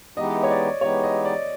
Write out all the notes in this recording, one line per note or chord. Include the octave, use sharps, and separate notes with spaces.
E3 G#3 B3 D#4 G4 D#5
C#5
D5
E3 G#3 B3 D#4 G4 C#5
D#5
D5